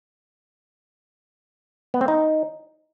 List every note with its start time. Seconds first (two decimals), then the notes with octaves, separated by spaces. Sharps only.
1.94 B3
2.01 C4
2.08 D#4